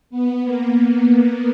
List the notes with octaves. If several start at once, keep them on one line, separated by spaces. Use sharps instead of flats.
B3
A#3
B3